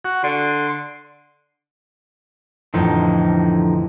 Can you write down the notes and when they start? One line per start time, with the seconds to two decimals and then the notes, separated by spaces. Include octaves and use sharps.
0.04 F#4
0.24 D3 C6
2.74 A1 F2 D3 F3 D#4